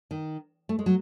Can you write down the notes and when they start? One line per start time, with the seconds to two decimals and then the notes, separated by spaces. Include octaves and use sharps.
0.11 D#3
0.69 A3
0.79 G#3
0.86 F#3